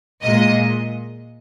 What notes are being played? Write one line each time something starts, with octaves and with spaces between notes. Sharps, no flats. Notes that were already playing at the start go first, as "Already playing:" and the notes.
A#2 G#3 D#5